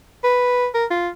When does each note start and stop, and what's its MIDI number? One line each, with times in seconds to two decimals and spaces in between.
0.24 0.67 71
0.74 0.85 70
0.90 1.09 65